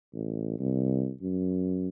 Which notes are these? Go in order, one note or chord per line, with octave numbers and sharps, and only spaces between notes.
A1
C2
F#2